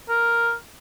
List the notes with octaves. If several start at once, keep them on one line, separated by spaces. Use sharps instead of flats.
A#4